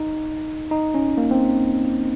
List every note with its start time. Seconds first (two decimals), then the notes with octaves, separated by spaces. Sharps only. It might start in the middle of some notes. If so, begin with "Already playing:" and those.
Already playing: D#4
0.71 D#4
0.94 C#4
1.17 A#3
1.31 C4